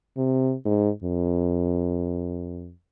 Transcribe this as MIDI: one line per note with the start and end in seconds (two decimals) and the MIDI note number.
0.17 0.54 48
0.65 0.89 44
1.03 2.72 41